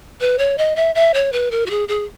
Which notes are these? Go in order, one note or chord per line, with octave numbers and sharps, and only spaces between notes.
B4
C#5
D#5
E5
E5
C#5
B4
A#4
F#4
G#4
G#4